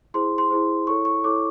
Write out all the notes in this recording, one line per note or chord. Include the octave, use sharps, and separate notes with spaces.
E4 G#4 C5 C6
C6
E4 G#4 C5
E4 A4 C#5 C#6
C#6
E4 A4 C#5 D6